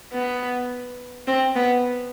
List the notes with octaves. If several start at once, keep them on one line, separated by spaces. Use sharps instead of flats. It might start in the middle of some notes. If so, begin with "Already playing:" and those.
B3
C4
B3